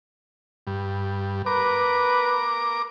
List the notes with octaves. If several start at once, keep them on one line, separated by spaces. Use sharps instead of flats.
G2
A#4 B4 D6